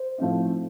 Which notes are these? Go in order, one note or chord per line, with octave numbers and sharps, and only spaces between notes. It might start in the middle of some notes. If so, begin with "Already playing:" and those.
Already playing: C5
A2 F3 A3 C4 D#4